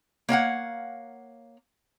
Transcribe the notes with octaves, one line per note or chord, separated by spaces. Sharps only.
A#3 C#5 F5 F#5